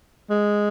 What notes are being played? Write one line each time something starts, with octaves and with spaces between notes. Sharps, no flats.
G#3